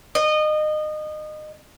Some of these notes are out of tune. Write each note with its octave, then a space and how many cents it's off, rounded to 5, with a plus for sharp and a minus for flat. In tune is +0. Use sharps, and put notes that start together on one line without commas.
D#5 -25